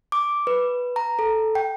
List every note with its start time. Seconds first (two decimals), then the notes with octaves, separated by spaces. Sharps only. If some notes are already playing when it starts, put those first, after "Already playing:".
0.12 D6
0.47 B4
0.96 A#5
1.19 A4
1.55 G5